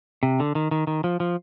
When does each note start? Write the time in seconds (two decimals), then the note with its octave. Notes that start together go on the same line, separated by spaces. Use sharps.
0.23 C3
0.40 D3
0.55 D#3
0.71 D#3
0.87 D#3
1.04 F3
1.20 F3